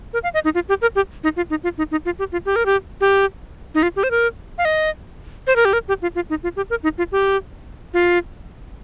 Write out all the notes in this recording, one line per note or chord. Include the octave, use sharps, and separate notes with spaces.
A#4
F5
D#5
D#4
F4
G4
A#4
G4
D#4
F4
D#4
F4
D#4
D#4
F4
G4
F4
G4
A#4
G4
G4
D#4
F4
G4
C5
A#4
F5
D#5
C5
A#4
G4
A#4
G4
F4
F4
D#4
F4
G4
A#4
D#4
F4
G4
F4